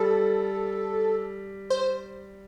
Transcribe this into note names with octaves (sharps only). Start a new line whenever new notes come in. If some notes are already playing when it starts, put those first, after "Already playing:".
Already playing: G3 A4
C5